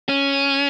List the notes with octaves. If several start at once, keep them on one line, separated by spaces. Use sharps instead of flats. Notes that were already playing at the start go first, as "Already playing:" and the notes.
C#4